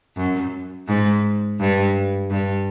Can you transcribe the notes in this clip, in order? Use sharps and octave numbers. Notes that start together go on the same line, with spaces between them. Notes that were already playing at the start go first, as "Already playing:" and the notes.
F#2
G#2
G2
G2